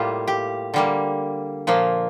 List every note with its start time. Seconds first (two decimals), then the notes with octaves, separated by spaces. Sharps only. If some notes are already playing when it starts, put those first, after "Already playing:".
Already playing: A2 G3 A#3 F4 G4
0.28 G4
0.74 D3 G3 A#3
1.67 A#2 F3 A#3